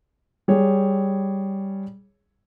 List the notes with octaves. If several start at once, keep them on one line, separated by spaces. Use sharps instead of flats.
G3 G#4 C#5